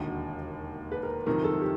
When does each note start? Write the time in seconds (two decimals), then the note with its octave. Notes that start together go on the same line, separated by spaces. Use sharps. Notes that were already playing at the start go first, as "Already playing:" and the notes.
Already playing: E1 D#2 D3 F#4
0.92 B4
1.03 A#4
1.26 F#1 F2 C3 D#3 A#4
1.44 A4
1.61 G4